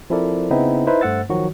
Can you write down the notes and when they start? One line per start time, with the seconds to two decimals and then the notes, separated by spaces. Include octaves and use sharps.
0.10 F3 C4 E4 A4 A#4 D5
0.50 C#3 B3 C4 D#4 E4
0.87 D#4 E4 B4 C5 E5
1.01 G2 A3 C5 F#5 E6 A6
1.30 D#3 F3 F#3 F#4